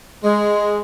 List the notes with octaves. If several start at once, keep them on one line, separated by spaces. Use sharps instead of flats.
G#3